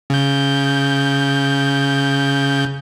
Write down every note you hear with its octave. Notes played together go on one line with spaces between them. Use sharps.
C#3 G6